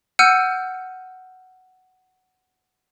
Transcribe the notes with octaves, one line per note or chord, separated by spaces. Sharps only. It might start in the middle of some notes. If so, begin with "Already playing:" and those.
F#5 E6 F6 G6 C#7 D#7